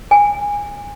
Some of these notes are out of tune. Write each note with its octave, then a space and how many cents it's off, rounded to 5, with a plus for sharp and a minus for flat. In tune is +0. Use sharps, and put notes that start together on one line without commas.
G#5 -20